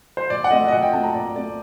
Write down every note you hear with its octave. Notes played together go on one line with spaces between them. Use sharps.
C5
A#2 D5
F#5
A3 C4 D#5
D#5
A#2 F#5
G5
A3 C4 A5
A#5
A#2 D5
A3 C4 D5